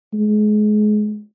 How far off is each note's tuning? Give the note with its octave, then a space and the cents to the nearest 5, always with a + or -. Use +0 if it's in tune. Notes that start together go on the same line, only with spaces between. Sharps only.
G#3 +30